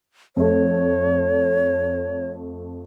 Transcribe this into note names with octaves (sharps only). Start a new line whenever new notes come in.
F2 A3 C#5